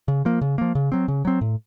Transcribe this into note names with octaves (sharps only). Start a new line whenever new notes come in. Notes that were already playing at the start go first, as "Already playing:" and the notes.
C#3
F3 A#3
C#3
F3 A#3
C#3
F#3 C4
C#3
F#3 C4
A2